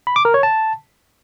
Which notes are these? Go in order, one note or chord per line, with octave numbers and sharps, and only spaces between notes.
B5
D6
A#4
C#5
A5